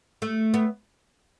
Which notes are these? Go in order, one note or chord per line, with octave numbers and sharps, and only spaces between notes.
A3
B3